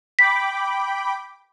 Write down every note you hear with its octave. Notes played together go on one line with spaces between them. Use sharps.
G5 B5 D6 B6